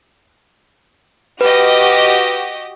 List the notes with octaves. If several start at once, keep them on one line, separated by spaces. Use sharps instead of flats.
F#4 G4 B4 D#5